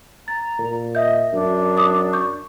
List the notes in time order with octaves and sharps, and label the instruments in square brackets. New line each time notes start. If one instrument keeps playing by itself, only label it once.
[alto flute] A#5 [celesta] A6
[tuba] A#2
[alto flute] D#5 [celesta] E5 G6
[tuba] F#2 [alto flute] D4
[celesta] D6 D#6
C#6 G6